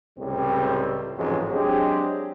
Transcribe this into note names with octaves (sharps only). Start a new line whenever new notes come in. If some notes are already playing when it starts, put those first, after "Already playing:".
C#2 A2 C3 G3 C4
A1 F2 G#2 C3 F#3 G#3
F#3 G#3 C4 D4 G4